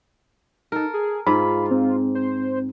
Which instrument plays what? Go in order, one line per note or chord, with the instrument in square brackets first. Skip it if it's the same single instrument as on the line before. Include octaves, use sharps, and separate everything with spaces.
[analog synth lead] D#4 [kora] A4 A#4
[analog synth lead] G#4
[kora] G#2 [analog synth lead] F4 [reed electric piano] B5
[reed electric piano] C4
[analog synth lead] C5